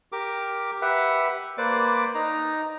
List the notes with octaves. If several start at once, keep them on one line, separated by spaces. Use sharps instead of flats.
G4 A#4 D6
G4 B4 E5 F#5
A#3 B4 C5 D5 D6
D#4 A#5